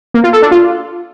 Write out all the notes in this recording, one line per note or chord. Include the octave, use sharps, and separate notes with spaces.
A#3
F4
A4
D4
F4